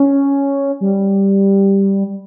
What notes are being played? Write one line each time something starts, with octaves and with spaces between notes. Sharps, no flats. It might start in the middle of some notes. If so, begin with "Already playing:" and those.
Already playing: C#4
G3